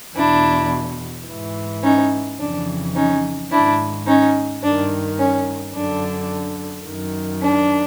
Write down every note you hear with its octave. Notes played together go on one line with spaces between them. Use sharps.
E2 B2 D4 E4
G#2 E3
C#4 D#4
F2 C#3 E3 D4
C#4 D#4
G#2 D#3 D4 E4
C#4 D#4
G2 D#3 D4
C#4
F#2 D3 D4
F#2 D#3
D4